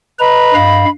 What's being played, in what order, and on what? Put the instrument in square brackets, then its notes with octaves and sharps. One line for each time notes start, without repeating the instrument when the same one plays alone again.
[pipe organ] B4 A#5 [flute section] D#5 B5
[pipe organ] G2 F5